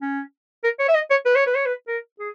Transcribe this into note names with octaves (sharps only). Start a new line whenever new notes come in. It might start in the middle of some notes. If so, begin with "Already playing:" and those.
C#4
A#4
C#5
E5
D#5
C#5
B4
C#5
B4
C#5
B4
A#4
G#4